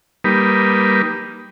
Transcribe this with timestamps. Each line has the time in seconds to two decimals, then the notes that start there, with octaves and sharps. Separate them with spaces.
0.24 G3 A#3 D#4 B4